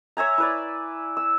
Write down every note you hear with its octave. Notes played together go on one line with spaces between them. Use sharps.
C#5 E5 G#5 A#5
E4 B4 D5
E6